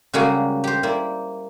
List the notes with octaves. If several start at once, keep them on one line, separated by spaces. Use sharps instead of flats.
C#3 G3 G#3 A#3 F#4 G#4
G4 C5
A#3 E4 D5